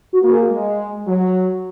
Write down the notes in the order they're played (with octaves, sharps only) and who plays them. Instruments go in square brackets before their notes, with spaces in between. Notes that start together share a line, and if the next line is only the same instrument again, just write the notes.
[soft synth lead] F#4
[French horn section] A#3
[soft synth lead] G#4
[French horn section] G#3
F#3